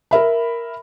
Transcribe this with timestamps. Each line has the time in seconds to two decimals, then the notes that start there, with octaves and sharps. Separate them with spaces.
0.11 A#4 E5 B5